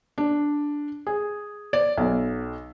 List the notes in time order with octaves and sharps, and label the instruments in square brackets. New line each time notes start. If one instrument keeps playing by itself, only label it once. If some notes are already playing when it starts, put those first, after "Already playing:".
[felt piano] D4
G#4
D5
B1